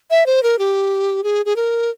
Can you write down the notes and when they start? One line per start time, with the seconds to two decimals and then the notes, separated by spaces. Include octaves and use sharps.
0.10 E5
0.26 C5
0.43 A#4
0.59 G4
1.24 G#4
1.46 G#4
1.56 A#4